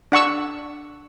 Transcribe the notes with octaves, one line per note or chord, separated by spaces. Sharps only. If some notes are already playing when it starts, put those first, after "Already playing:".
D4 F#5 C#6 E6